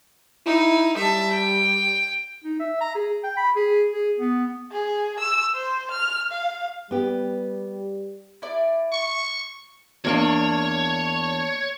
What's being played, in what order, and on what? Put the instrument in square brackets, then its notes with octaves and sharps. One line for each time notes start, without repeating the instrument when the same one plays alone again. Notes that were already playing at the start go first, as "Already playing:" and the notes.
[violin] D#4 [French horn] E4
[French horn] G3 [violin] E5 A5
[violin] G5
[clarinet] D#4
E5
A#5
G#4
G5
B5
G#4
G#4
B3
[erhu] G#4
E6
C5
F6
F5
[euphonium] G3 [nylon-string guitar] B3 G4
[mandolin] E4 D5
[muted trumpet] C#6
[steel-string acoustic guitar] E2 A#3 D4 [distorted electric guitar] C#5